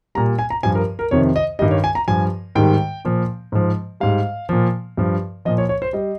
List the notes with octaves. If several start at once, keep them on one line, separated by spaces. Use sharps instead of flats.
A#2 G3 A#5
G#5
A#5
G2 F3 G#5
A#4
A#4
F2 C3 D#3 C#5
D#5
G2 D#3 G3 D#5
C#5
G#5
A#5
G2 F3 G#5
G#2 D#3 G3 G5
A#2 F3
G#2 F3
G#2 G3 F5
A#2 F3
G2 F3
A#2 F3 D#5
C#5
C#5
C5
G3 D#5